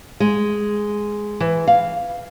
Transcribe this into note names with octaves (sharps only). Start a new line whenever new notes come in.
G#3
E3
F5